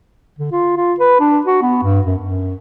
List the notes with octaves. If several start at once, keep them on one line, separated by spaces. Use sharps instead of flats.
D3
F4
F4
B4
D4
F#4
B3
G2
F#2
F#2